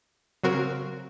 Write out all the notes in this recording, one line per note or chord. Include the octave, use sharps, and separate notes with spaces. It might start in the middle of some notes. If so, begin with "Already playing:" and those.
C#3 F#3 C4 F#4 A#4